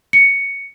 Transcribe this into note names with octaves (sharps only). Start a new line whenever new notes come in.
C#7